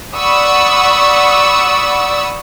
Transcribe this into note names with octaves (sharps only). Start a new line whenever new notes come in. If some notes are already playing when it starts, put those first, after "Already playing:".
D5 F#5 B5 C#6 D#6 E6